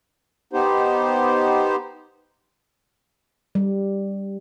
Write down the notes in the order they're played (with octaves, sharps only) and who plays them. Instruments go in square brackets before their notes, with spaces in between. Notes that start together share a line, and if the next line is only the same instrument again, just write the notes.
[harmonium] B3 D#4 G4 C5
[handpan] G3